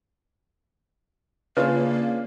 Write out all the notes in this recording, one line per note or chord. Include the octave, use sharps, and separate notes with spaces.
C#3 A#3 D4 F4 B4